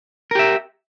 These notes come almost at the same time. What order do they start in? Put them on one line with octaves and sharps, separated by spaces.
A#4 G4 E5